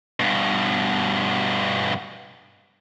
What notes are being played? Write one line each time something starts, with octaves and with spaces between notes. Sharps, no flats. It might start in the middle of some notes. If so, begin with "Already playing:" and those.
G2 B2